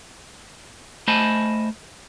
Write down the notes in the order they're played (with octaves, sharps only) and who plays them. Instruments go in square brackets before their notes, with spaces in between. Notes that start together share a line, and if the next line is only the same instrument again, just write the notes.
[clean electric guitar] A3 C5 D#5 G#5 A5 B5